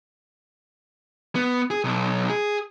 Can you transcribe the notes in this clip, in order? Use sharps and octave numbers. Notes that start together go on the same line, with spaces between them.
B3
G#4
B1
G#4